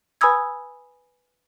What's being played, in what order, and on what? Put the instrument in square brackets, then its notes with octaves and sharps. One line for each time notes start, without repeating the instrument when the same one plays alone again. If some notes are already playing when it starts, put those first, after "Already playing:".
[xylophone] B4 G#5 B5 D#6 E6 G#6